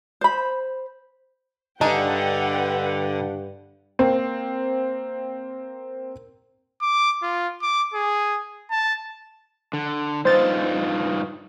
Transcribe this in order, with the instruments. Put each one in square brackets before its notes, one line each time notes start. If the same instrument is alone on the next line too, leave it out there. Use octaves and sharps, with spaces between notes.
[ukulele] C5 B5
[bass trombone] G2 [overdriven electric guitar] D3 [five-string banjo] D4 D#4 G#4 [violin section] B4 F#5 G5
[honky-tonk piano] A#3 C4
[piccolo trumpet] D6
F4
D6
G#4
A5
[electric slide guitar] D3
[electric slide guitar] G2 D#4 F4 [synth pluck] C5 A6